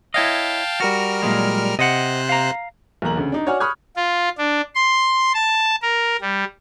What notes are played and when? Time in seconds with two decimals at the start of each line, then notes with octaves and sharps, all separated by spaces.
0.14 E4 C#5 D#5 F5 G5 A5
0.80 G3 F#4 A#4 F6
1.23 A#2 F#3 G#3
1.79 C3 C5 D#5 F#5 F#6
2.29 F5 A#5
3.02 B1 E2 A#3 A#5 F#7
3.17 D2 C#3
3.32 D4 D#4 D5
3.46 F#4 C#5 D5 F#5 G#5 F6
3.60 B5 C#6 D#6 F6 F#6 G#6
3.96 F4
4.38 D4
4.75 C6
5.34 A5
5.82 A#4
6.21 G3